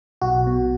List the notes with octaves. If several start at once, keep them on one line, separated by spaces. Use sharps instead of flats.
B1 F#4
B2